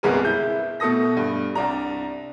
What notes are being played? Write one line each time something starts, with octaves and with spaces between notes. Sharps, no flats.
G1 C2 G#3 G#4 A#4 B4
E4 G6
B2 A3 A4 D#6 A#6
G2
C2 D4 A#5